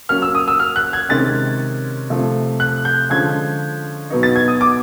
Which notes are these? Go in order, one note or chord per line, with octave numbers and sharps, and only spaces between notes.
F#3 A#3 C#4 F6
E6
D#6
E6
F6
F#6
G#6
C3 D#3 G#3 C#4 A6
C3 F3 A3
F#6
G6
D3 F3 G#3 C#4 G#6
B2 F#3 B3 D#4
A6
G#6
D#6
D6